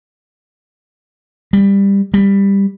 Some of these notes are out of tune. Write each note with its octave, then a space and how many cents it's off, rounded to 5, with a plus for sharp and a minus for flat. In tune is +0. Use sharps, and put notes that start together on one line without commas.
G3 +15
G3 +15